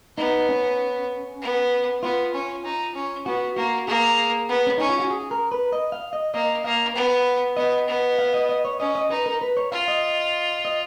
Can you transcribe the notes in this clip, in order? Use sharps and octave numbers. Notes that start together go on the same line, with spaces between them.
B3 D#4
C#4
B3
B3 F4
C#4
D#4
C#4
B3 F#4
A#3 F#4
A#3 G#4
B3
C#4
C#4 D#4
F4
F#4
G#4
A#4
B4
D#5
F5
D#5
A#3 D#5
A#3 F5
B3
B3 D#5
B3
F5
D#5
D#5
C#5
C#4 D#5
D#5
D#4 B4
A#4
B4
C#5
F4 F5
D#5
D#5